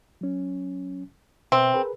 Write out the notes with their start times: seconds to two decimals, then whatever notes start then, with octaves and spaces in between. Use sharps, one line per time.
0.21 F#3 C#4
1.52 B2 C4 B4 E5
1.74 G#4 A#4 B4